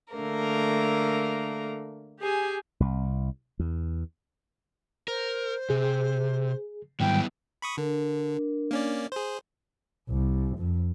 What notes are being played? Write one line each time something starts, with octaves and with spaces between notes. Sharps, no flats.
D3 A3 A#3 A#4
G4 G#4 G#5
C2
E2
A#4 C5
C3 G#4
G#2 D#3 F#3 G3 B3 E4 G5
B5 C#6 D#6
D3 D4 A#4
A#3 C#4 D5
G#4 C5
C2
F2